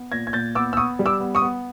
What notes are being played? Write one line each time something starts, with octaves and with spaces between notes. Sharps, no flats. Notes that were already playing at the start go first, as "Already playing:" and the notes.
Already playing: B3
A#2 G#6 A#6
G#6
A#2 G6 A6
B3 D6 E6
E6
B3 C#6 D#6
G3
D6 E6
B3
C#6 D#6
B3